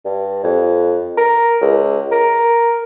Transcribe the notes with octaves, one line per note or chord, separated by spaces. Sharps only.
G2
F2
A#4
C#2
A#4